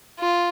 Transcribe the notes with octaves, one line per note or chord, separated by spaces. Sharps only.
F4